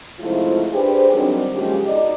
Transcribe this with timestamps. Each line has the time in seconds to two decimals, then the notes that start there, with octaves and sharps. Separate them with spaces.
0.19 G#2 C3 F3 A3 E4 F4
0.72 D4 G4 G#4 B4 C5
1.11 D#3 F#3 G3 C4 D4 G4
1.55 C#3 F3 F#3 G#3 A#3 G4
1.86 B2 D#4 D5